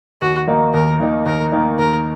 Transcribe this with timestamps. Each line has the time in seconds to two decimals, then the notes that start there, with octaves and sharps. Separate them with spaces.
0.22 D#2 F#4
0.47 D#3 A#3 D#4
0.74 D#2 A#4
1.00 D#3 A#3 D#4
1.26 D#2 A#4
1.52 D#3 A#3 D#4
1.79 D#2 A#4